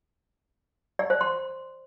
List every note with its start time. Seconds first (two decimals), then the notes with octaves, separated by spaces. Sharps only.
0.99 D5
1.10 C5
1.21 C6